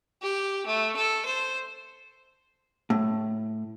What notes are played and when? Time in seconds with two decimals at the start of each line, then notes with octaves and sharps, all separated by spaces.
0.22 G4
0.66 A3
0.97 A4
1.26 C5
2.90 A2